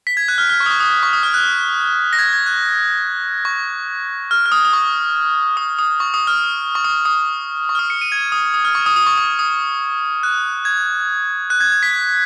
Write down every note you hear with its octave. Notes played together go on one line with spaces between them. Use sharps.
B6
G#6
F#6
F6
F6
C#6
D#6
C#6
D#6
D#6
C#6
D#6
F6
F#6
A#6
G#6
G#6
F#6
C#6
F6
F6
D#6
D#6
C#6
D#6
D#6
C#6
D#6
F6
C#6
D#6
D#6
C#6
F6
D#6
C#7
D#7
G#6
D#6
D#6
F6
C#6
D#6
D#6
C#6
D#6
D#6
F#6
G#6
F#6
G#6
G#6
B6